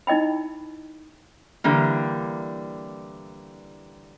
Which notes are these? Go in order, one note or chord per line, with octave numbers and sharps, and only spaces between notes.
D#4 E4 D#5 G5 B5
D3 E3 G3 A#3